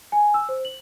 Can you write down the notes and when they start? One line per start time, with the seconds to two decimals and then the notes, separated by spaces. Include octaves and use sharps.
0.12 G#5
0.34 E6
0.49 C5
0.65 F#7